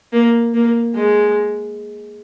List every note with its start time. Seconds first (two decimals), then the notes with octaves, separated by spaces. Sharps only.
0.13 A#3
0.54 A#3
0.94 G#3